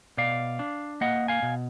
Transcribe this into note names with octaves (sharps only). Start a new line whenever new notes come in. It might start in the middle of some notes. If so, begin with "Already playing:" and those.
B2 D5 F5
D4
A#3 D#5 F#5
F5 G#5
B2